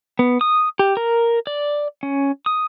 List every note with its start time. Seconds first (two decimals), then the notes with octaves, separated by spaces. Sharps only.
0.19 B3
0.41 D#6
0.79 G4
0.97 A#4
1.47 D5
2.03 C#4
2.46 D#6